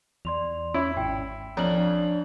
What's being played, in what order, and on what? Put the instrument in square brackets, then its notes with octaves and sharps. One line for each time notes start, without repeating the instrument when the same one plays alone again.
[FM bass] E2 [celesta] D5 C6 F7
[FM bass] C#4 [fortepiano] E4
[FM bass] G#1 [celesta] G5
[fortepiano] F2 [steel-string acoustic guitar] C#4 D4 [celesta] A#5 F#7